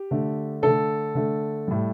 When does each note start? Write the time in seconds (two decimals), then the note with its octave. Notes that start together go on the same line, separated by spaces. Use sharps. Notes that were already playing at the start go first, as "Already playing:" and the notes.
Already playing: G4
0.11 D3 A3
0.62 D3 A3 A4
1.15 D3 A3
1.68 A2 G3